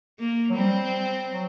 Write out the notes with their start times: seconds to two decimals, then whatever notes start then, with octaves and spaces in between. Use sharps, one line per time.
0.19 A#3
0.50 F#3
0.56 G3 C4
1.32 F#3